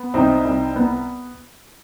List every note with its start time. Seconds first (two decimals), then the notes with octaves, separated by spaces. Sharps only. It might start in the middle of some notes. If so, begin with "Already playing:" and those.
Already playing: B3
0.14 C2 C4 D#4
0.45 C2
0.76 B3